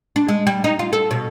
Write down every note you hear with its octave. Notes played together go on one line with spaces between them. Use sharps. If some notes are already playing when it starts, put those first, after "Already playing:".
D4
G#3
G3
D#4
F4
A4
B2